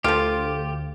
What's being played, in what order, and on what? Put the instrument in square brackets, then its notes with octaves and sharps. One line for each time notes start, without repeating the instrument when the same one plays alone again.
[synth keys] D2 [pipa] F3 F4 [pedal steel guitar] G4 [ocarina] A4